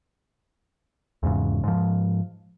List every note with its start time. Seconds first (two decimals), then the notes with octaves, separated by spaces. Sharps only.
1.23 E2 G#2 C#3
1.64 G#2 F3